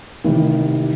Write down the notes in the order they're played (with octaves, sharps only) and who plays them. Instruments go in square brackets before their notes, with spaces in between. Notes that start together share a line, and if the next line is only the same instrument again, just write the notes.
[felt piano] A1 C3 D#3